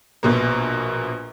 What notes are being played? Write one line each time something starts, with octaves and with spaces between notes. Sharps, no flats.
A#1 B2 A#3